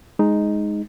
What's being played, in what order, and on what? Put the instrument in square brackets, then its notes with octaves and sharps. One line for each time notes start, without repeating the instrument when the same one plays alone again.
[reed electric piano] G#3 D#4